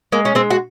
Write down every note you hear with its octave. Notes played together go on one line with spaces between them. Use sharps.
G#3 A#3
C#4
G#3 C4
F#4